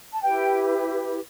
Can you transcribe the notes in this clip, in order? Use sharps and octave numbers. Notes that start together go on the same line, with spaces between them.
A5
E4 G4 B4 G5